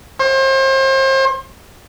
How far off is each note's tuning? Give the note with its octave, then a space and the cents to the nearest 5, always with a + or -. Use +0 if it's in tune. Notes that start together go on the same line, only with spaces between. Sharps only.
C5 +35